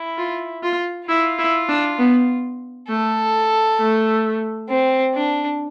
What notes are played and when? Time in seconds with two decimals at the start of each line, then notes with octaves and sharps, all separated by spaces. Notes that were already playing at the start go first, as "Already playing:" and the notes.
Already playing: E4
0.18 F4
0.63 F4
1.08 E4 F4
1.38 E4
1.68 D4
1.98 B3
2.88 A3 A4
3.79 A3
4.69 C4
5.14 D4